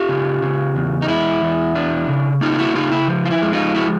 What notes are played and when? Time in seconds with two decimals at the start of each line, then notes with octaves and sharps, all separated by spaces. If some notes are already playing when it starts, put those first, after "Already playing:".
Already playing: F4 G4
0.09 C#3
0.42 C#3
0.76 E2
1.02 D#4
1.08 G#3 E4
1.42 E2
1.75 D4
2.09 C#3
2.41 A#3 D#4 F4
2.52 F4
2.58 E4 F#4
2.75 C#3 D#4 F4
2.92 E4
3.08 F3
3.25 F4
3.31 E4
3.42 G#3
3.53 D#4 F4
3.75 F3 E4 F#4